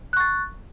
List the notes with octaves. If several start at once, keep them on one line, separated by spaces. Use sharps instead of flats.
C#6 F#6 A6